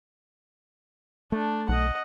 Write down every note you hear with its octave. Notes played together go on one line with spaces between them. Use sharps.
A3 D4
B1 D#5 F#5